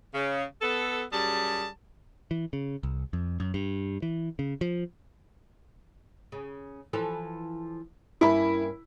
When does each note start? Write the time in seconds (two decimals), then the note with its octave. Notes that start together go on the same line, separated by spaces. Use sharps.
0.14 C#3
0.61 B3 A4
1.12 F#2 G3 G#4 A5
2.31 E3
2.53 C#3
2.83 C2
3.13 F2
3.40 F#2
3.54 G2
4.02 E3
4.39 C#3
4.61 F3
6.32 C#3
6.93 E3 F3 A4
8.21 G2 A#3 C#4 E4 B5